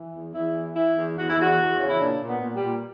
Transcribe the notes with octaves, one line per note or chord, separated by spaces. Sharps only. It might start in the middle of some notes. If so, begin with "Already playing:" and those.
Already playing: E3
E2
E2 E4
E3
E3 E4
E2
E2 F#4
E4
E2 F#4
E2
C#3
E4
A#2 D4
A#2
B3
A#2
G3
A#2